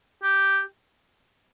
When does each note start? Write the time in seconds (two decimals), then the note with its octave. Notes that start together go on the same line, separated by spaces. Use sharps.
0.23 G4